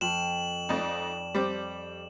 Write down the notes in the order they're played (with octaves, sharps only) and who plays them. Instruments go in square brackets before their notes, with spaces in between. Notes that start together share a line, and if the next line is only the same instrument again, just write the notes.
[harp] F2 [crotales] E7 F#7
[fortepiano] F2 D#4 [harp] D5
[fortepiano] G3 C4 D6